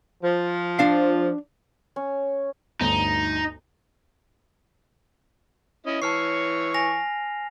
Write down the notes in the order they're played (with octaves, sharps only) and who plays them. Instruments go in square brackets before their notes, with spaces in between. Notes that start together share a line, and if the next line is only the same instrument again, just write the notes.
[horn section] F3
[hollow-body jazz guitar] D4 F5
[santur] C#4
[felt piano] G1 D2 [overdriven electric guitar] D#4
[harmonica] C#4 E4 D#5
[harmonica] E3 C#5 C#6 [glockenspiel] A5 F6 C7
[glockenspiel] G#5 A#6 F7